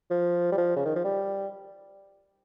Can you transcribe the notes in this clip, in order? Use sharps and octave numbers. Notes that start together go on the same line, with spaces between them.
F3
G3
F3
C#3
D#3
F3
G3